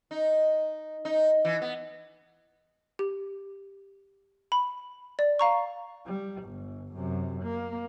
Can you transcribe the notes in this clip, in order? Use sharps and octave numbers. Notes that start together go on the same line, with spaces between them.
D#4
D#4
E3
B3
G4
B5
D5
F5 A#5 C#6
G3
G1
F#2 C3
A#3